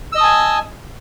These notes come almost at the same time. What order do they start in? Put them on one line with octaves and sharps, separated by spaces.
E6 D#5 D#6 A5 G#5